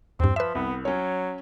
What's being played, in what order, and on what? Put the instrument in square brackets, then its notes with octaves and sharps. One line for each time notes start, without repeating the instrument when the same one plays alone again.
[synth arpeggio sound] E2 G2 [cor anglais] C4
[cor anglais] F3 [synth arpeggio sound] B4 E5
[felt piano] C2 [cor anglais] B3
[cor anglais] F#3 [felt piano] C#4 C#5